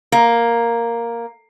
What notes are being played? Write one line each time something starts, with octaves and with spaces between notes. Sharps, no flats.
A#3